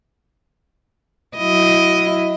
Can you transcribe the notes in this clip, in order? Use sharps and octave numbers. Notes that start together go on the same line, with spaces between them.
F#3 E4 D#5